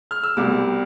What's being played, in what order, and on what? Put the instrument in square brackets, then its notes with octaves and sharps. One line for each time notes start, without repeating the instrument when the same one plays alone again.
[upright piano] F6
E6
C2 B2 G3 D6